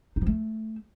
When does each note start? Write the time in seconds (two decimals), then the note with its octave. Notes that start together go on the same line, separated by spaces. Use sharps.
0.16 D#4
0.21 F3
0.27 A3